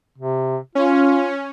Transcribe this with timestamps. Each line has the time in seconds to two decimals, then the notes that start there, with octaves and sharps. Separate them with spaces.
0.18 C3
0.75 C#4 F4